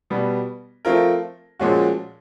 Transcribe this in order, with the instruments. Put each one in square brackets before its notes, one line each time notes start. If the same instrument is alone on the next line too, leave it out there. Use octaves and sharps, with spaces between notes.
[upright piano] B2 G3 B3
F3 A3 C4 F4 A#4
A#2 F3 G#3 C#4 F#4